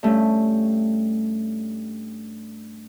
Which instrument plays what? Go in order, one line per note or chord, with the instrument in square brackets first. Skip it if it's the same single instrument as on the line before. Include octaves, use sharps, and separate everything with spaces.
[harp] G2 A3 C#4